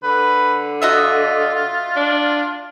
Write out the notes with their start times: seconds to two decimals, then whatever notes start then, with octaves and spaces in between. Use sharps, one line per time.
0.03 D3 B4
0.82 F4 F#4 D#5 E5
1.96 D4